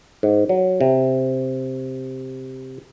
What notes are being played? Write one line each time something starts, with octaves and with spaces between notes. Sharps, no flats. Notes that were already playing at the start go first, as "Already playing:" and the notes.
G#2
F#3
C3